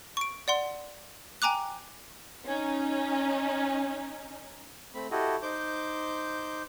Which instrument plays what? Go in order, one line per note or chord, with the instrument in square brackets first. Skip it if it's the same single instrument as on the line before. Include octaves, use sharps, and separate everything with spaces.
[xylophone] C#6 D7
D5 F#5 C6
G5 G#5 A#5 D6 F#6
[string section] C#4 D#4
[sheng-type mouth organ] A3 C4 B5
E4 F#4 G4 A4 D#5
D#4 C5 D6 G6